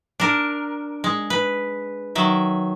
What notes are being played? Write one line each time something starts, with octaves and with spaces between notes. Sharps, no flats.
D4 A#4
G#3
B4
D#3 F#3 E5